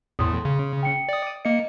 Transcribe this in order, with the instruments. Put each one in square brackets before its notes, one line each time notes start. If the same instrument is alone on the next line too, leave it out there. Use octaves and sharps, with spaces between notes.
[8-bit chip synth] E2 A2 [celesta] C6 D#6
[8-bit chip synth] C#3
[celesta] G5 C#7
[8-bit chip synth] D5 D#6
[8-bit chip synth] A#3 C#7 [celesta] D#5